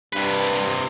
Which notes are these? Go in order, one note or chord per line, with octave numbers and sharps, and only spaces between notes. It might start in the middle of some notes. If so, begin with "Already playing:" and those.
G2 C3 B4